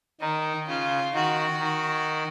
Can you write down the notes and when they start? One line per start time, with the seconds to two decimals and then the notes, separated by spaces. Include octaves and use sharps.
0.21 D#3 D#4
0.67 C#3 F4
1.14 D#3 F#4
1.60 D#3